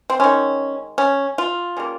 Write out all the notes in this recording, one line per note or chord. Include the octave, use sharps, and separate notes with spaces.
C4
D#3 G#3 C#4
C#4
F4
C#3 G3 A#3